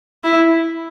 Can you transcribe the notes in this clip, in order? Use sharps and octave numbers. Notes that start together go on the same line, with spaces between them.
E4